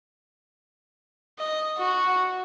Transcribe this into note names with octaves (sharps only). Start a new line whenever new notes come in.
D#5
F#4